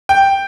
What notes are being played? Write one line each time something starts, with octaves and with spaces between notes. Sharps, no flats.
G5